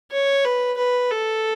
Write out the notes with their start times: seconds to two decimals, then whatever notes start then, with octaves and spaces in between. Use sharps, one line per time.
0.12 C#5
0.45 B4
0.77 B4
1.11 A4